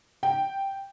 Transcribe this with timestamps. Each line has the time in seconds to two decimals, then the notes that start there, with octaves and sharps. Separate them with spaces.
0.23 G5